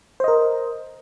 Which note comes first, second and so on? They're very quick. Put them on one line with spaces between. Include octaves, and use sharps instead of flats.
C5 D#5 A#4